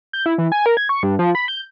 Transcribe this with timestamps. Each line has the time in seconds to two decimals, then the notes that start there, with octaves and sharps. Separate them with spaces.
0.13 G6
0.26 E4
0.38 E3
0.52 G#5
0.66 A#4
0.77 G#6
0.89 C#6
1.03 G2
1.19 F3
1.35 B5
1.48 G6